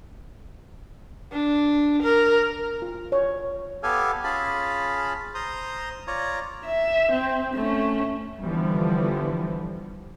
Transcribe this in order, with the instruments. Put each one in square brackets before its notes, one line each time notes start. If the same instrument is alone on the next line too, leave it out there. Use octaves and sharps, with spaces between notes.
[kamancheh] D4
A#4
[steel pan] F4
C#5
[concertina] B3 G4 A4 F5 G#5
C#4 F4 G#4 F5 A5 B5
C5 A#5 C6 D#6
F4 C#5 D5 A#5
[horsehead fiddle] E5
C4
A3 C#4
[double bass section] D3 E3 F3 G3 B3